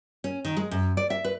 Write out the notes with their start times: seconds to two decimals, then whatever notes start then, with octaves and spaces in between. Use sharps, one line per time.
0.24 C#4
0.45 D#3
0.57 G#3
0.71 F#2
0.97 D5
1.10 E5
1.25 B4